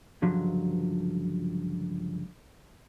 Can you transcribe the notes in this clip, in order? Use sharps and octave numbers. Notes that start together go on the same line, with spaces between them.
C#2 G2 D3 F3 F#3